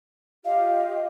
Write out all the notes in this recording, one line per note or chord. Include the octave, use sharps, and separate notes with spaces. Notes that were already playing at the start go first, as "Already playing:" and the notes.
F4 G4 D#5 F5